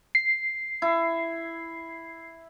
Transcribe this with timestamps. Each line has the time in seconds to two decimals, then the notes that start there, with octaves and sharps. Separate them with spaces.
0.15 C7
0.82 E4